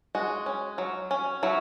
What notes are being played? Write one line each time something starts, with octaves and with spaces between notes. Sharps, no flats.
G#3 F#4
C#4
F#3
C#4
F#3 E4